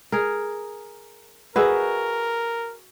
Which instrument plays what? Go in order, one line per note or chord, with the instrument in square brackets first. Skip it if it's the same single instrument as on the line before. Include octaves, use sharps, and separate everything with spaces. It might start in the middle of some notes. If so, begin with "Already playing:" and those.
[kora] G#4 A#4
[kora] F#4 D#5 E5 [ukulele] G#4 [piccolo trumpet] A#4 [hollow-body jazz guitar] B4